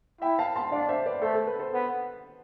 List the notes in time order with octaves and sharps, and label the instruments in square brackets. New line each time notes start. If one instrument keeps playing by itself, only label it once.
[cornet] E4 [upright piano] E5 G5
[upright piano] F5 A5
A5 C6
[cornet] D4 [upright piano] D5 F5
[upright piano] C5 E5
B4 D5
[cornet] A3 [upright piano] A4 C5
[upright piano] A4
B4
A4 C5
[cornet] B3